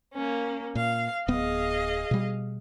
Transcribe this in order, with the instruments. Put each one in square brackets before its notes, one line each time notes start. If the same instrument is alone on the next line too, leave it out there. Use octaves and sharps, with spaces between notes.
[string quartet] A#3 C#4
[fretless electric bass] A#2 [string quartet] F5
[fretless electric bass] D1 B3 [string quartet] G#4 D#5 F5
[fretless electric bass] B2 G3